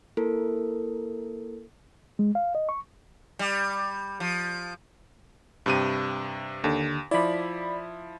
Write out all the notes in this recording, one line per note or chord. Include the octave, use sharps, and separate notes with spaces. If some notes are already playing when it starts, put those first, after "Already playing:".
A#3 E4 A4 A#4
G#3
F5
D#5
C#6
G3
F3
G2 C3 D#7
D#2 D3
F3 E4 D5 B5